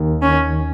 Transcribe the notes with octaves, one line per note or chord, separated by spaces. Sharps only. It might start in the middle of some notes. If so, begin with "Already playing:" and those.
Already playing: D#2 D#3
C#4